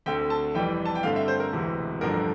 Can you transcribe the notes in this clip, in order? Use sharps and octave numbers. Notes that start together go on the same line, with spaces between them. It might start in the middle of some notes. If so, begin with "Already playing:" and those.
D2 D3 A3 C4 G5
A5
F1 F2 E3 G3 G5
A5
G5
G2 D3 A3 C4 F5
E5
C5
A#4
E1 D2 C3 E3
A1 G2 D3 F3 A3 A#4